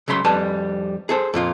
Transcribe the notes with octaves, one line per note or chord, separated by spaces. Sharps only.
C#2 C#3 F#3 B5 C6
F2 G3 B4 G#5 A5
G#4 A4 C5
F2 A#2 F4